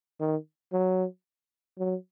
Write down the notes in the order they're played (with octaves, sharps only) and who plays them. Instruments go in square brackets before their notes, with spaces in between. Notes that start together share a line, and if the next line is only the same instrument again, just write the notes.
[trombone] D#3
F#3
F#3